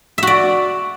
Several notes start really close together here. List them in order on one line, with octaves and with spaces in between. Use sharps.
E5 F#4 D5